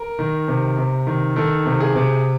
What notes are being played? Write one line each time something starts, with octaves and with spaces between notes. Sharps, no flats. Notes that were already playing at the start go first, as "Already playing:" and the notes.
Already playing: A#4
D#3
C3
C3
D#3
D#3 A4
C3
G#4
C3